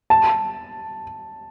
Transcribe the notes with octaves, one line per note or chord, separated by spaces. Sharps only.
A5